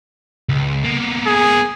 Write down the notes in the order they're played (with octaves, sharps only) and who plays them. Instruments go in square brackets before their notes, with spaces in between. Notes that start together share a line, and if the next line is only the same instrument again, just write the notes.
[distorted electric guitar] C#2
A#3 B3
[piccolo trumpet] G#4